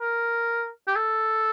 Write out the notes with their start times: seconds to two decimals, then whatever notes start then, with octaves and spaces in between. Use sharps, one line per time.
0.01 A#4
0.88 G4
0.96 A4